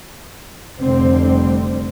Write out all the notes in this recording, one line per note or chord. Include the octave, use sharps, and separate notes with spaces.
F1 D3 G3 C4